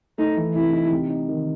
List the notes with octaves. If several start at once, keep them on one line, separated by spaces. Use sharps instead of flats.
A3 D#4
E3
C3 E4
D#4
C3
D#4
D#3